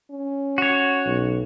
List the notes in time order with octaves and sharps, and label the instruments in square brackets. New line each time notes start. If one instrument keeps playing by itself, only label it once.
[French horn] C#4
[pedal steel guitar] F#4 C#5
[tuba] B1